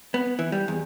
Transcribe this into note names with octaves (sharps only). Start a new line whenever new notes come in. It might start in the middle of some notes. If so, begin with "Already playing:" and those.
B3
E3
G3
E2